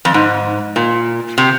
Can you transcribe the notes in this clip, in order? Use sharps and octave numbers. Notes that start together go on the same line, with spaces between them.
F2
G#2
A#2
C3